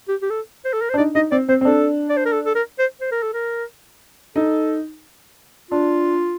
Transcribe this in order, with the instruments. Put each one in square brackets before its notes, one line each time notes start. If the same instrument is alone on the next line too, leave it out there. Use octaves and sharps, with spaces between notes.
[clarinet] G4
G4
A4
C5
A4
A#4
C5
[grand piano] D4
[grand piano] D#4 [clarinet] D5
[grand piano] D#4 [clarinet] D#5
[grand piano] C4 [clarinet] D5
[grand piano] C4 [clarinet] C5
[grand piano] C4
[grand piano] D4 [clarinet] A4
[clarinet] D5
C5
A#4
A4
A4
A#4
C5
C5
A#4
A4
A#4
[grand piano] D#4 [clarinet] A4
[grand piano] D4 [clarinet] F4